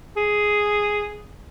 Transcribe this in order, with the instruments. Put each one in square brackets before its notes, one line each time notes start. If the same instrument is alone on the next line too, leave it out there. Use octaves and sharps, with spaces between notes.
[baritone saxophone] G#4